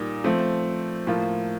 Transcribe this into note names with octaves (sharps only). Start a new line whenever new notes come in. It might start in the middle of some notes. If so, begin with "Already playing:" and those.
Already playing: A#2 G3 A#3 D#4
F3 A3 C4
A2 F3 A#3 F4